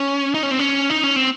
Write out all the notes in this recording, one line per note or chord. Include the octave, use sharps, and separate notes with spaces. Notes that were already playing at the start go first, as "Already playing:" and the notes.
Already playing: C#4
D#4
C#4
C4
C#4
D#4
C#4
C4